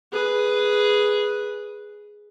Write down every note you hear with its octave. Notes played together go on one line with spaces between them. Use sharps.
G#4 B4